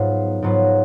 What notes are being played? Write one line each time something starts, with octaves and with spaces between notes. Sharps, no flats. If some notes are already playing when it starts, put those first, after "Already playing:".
Already playing: G#2 F#3 B3 F4
G#2 F#3 B3 F4